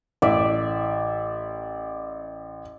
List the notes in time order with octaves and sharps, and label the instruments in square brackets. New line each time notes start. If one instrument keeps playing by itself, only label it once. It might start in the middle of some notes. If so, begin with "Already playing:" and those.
[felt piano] A1 [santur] D5 E5